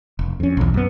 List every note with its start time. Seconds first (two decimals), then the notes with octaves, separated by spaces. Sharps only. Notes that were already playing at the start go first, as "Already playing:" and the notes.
0.19 F1
0.40 F2 C#4
0.57 B1 E2
0.74 F#2 B3